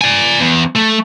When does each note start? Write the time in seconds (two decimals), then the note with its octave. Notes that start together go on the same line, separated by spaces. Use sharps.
0.01 D5 G#5
0.40 E2
0.76 A3